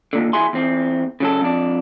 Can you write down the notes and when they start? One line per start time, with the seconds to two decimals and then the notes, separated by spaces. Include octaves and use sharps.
0.13 D#2 A#2 D3
0.33 E2 E4 F#4 G#4 G#5 C6
0.53 E2 C4
1.20 C#3 F#3 A4
1.41 F2 D4